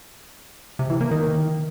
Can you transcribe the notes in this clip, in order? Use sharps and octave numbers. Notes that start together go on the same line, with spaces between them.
C3
E3
A#3
D#3